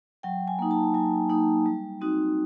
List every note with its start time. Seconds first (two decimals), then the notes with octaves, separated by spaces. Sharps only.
0.23 F#3 G5
0.48 G#5
0.59 A#3 D#4
0.71 A5
0.94 F#3 G#5
1.30 A#3 D#4
1.66 G3
2.01 C4 D#4 F#4